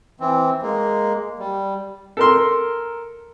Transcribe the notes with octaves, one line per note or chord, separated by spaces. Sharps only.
E3 C4
G#3 A#3
G3
A4 A#4 C6